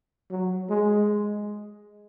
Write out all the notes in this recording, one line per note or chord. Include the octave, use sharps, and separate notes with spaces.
F#3
G#3